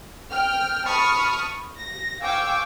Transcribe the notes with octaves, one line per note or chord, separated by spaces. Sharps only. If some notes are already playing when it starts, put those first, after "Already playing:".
G5 F6
A5 B5 C#6 D#6 F6
A#6
F5 G5 G#5 C#6 D6 E6